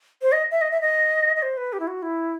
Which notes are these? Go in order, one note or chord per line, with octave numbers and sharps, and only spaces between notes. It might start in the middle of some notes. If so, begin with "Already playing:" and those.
C5
D#5
E5
D#5
E5
D#5
D#5
C5
B4
G4
E4
F#4
E4